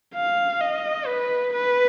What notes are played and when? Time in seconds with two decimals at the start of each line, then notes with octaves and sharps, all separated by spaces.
0.15 F5
0.61 D#5
1.07 B4
1.53 B4